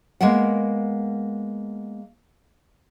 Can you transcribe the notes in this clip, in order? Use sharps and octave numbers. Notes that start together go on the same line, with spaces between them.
G#3 A#3 B3 A#4 F#5